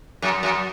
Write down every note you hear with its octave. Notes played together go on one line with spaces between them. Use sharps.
F#2
F#2